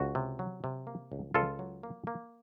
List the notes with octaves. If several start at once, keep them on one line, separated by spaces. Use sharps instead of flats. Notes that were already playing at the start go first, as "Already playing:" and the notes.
Already playing: C#2 F#4
C3
F#3
C3
A#3
C#2
C#2 F4 A4
F#3
A#3
A#3